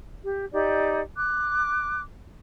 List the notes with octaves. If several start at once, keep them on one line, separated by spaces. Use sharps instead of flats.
G4
D#4 G4 D5
D6 F#6